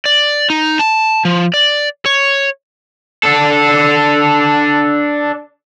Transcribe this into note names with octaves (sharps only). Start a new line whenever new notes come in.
D5
D#4
A5
F3
D5
C#5
D4 A4